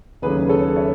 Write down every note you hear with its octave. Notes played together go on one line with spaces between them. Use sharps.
D#2 C#3 F#3 A3 C#4 G#4 B4
A4 C#5
C#5 E5